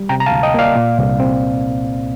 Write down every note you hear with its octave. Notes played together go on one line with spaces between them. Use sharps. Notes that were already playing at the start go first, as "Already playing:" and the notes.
Already playing: G3
C3 G5 A#5
A#5
F5 A5
D2
D#5 G5
A#3 D5 F5
A#2
C2
C4